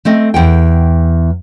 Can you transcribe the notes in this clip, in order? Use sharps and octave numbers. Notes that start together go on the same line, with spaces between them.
A3 C4 D#5
E2 F#5 G5